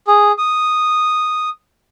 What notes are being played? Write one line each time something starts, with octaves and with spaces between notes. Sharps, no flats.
G#4
D#6